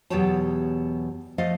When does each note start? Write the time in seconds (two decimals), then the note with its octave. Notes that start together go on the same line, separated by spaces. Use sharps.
0.10 E2 B2 F#3 G4 C#5 A5
1.38 F3 A3 D#5 F5